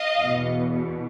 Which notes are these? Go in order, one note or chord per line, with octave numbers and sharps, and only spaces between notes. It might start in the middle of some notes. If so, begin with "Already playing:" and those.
Already playing: D#5 F5
E2 B2